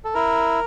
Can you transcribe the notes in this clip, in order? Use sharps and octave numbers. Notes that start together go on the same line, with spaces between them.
A4
E4 A#4